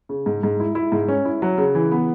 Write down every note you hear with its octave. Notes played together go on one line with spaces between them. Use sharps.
C#3
G#2
G#2
E4
E4
G#2
C#4
E4
F#3
C#3
E3
B3